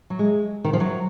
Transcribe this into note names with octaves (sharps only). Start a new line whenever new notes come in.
F#3
G#3
D#3
F3
F#3